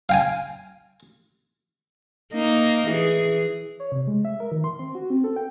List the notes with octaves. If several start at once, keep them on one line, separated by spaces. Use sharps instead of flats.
F5 G5 G#5
A#3 D#4 D#5
E3 G#4
C#5
C3
G#3
E5
A#4
D#3
C6
C4
F#4
C4
A4
G5